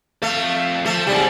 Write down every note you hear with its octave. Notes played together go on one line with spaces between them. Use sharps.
F2 A3 F5
F3 A3
G#2 C3 F#3 G3